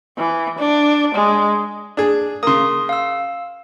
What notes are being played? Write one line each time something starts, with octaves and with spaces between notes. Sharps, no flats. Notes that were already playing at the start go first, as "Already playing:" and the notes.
E3
D4
G#3
D4 G#4
C#3 A#3 C6 D#6
F5 E6